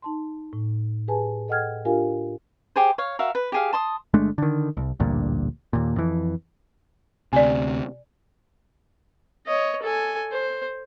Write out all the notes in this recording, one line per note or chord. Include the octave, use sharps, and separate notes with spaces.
D#4 A5 C6
A2
G4 G#4 B4 G#5 A5
A4 D#5 F#5 G5 F6 G#6
D4 F4 G4 A#4 F5 G#5
G4 G#4 C5
C#5 F5
F#4 A#4 E5 F5
B4
G4 G#4 F5
A5 C6 D#6
G1 G#3 A3 D4
D3 D#3
C2
A1 D2 G2 A#2
D#2 A#2
F2 E3
D2 C3 D5 G#5
C#5 D#5
A4 G#5
C5